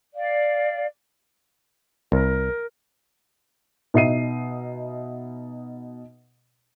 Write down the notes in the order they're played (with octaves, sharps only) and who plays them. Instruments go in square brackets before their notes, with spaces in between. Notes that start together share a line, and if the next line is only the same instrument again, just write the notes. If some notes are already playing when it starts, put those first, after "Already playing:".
[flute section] D5 F5
[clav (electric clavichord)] C2 [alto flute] A#4
[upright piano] B2 D#4 E5 C7 D#7